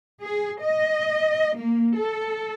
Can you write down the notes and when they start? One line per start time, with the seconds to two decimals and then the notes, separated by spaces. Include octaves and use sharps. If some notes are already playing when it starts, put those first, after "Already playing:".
0.23 G#4
0.61 D#5
1.56 A#3
1.97 A4